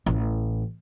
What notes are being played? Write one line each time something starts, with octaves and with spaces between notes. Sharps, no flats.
A1 E4